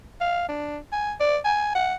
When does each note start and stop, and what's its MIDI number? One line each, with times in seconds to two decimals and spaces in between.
0.21 0.47 77
0.49 0.78 62
0.92 1.13 80
1.20 1.38 74
1.45 1.70 80
1.75 1.95 78